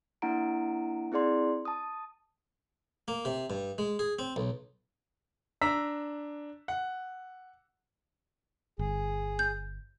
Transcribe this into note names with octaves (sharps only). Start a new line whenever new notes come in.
A#3 D4 E4 F#5 A#5 D7
C4 E4 G#4 D5 C6
A5 D#6
A#3
C3
G2
G#3
G#4
C4
B1
D4 A#5 E6 B6
F#5
G1 G#4
G6